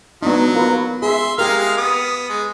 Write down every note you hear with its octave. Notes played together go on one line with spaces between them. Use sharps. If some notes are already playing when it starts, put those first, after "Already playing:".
F#3 B3 D4 D#4
F4 A#4 B4
G#4 E5 C6
G#3 G4 A#4 F5 F6
B3 D#6
G#3